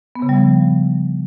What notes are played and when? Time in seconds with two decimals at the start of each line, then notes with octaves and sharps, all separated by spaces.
0.16 B3
0.22 C#3
0.29 G3
0.36 F3